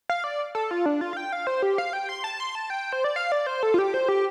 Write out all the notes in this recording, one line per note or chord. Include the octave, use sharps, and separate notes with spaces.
F5
D5
A4
F4
D4
F4
F5
G5
F5
C5
G4
F5
G5
C6
A5
C6
A5
G5
C5
D5
F5
D5
C5
A4
F4
G4
C5
G4